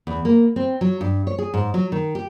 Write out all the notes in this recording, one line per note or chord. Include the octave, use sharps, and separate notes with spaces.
E2
A#3
C4
F#3
G2
C#5
G#4
G#2
F#3
D#3
G4